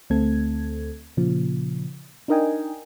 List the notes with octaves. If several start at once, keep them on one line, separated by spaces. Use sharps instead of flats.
D2 A3 C4 A4 G#6
A#2 C#3 F3
D4 D#4 A#4 D#5 G5 G#5